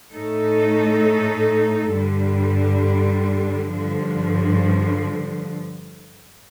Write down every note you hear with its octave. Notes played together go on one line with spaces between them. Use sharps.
A2 A3 D#4 A4
G2 D3 G3
G2 D3 F3